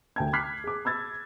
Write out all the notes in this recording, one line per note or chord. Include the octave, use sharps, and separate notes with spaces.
D2 G5 G#6
D6 F6 F#6 G#6 B6 C7
G#4 D6
B5 E6 G#6 A6